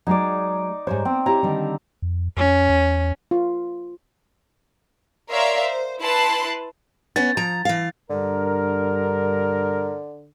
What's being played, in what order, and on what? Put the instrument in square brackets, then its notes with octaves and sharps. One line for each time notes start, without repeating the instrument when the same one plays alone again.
[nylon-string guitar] F#3 G#3 [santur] D#4 D5
[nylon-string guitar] G#2 G3 C#5 [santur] C5
[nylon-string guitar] B3 [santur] C4
[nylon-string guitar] E4 G4 C#5 [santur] A#5
[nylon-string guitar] D3 D#3 G3
[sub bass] F2
[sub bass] F2 [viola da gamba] C#4
[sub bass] E2
[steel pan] F4
[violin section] A#4 C#5 D5 E5 F5 C6
C5
E4 B4 A5 C6 F#6
[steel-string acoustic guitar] B3 C#4 C#5 [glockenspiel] A6
[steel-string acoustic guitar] F3 A#5
E3 F5
[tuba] G2 [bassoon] D3 [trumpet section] A#4